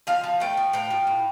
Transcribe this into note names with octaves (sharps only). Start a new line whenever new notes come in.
F3 F5
F3
A3 G5
F3
A2 G5
F3
A2